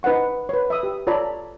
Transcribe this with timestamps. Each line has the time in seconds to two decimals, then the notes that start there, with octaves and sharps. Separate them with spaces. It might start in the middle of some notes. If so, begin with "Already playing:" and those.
0.03 D#4 B4 C5 F#5 C#6
0.49 B4 C#5
0.70 E5 B5 D#6
0.83 G4
1.07 F4 A4 C#5 D5 A#5 B5